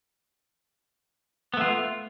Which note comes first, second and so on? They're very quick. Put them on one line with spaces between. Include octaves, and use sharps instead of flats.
B3 A3 F4